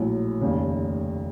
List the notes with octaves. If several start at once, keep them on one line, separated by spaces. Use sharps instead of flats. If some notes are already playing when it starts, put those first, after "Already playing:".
Already playing: A#1 A2 F#3
F1 D#2 C#3